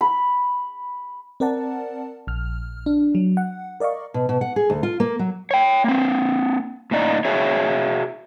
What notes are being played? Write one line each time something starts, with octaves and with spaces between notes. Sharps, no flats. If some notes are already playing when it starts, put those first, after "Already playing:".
B5
C4 A#4 D5 F#5 A5
A#1 F6
D4
F#3
F#5
A#4 D5 D#5 F5 C#6
B2
B2
F#5
G#4
D2
F4
A#3
F#3
C#5 G5
A#3 C4
A2 A#3 D#4 D5
F#4 G#4 C#5 E5